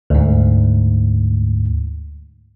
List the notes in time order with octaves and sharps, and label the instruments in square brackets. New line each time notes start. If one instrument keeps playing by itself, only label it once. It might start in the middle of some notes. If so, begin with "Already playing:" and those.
[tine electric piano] D2 G#2